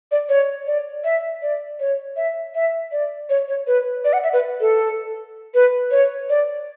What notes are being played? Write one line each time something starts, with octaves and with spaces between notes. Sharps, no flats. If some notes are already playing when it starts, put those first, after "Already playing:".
D5
C#5
D5
E5
D5
C#5
E5
E5
D5
C#5
C#5
B4
D5
F#5
E5
B4
A4
B4
C#5
D5